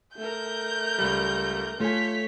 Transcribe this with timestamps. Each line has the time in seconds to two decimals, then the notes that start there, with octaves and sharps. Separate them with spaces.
0.17 A3 A#4 G6
0.98 C#2 G3
1.80 A3 F4 A4 C#5 G#5 B6